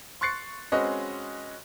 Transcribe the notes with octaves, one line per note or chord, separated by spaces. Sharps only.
C6 C#6 F#6 A6 C7 C#7
G#3 C4 C#4 F#4 B4 D#5